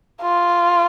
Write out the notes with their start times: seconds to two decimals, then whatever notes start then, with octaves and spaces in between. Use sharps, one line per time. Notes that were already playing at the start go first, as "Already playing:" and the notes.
0.22 F4